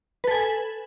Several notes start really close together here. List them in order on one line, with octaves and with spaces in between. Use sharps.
B4 A4 G#5